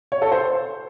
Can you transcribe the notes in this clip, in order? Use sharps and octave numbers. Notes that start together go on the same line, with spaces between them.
C#5
A4
C5